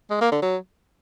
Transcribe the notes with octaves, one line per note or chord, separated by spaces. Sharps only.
G#3
A#3
D3
F#3